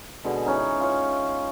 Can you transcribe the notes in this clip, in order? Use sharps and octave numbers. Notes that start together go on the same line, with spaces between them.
B2 D3 G#3 B5
E3 C#4 D#4
F4 C#5